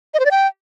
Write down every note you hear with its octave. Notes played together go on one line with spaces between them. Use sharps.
D#5
C5
D5
G5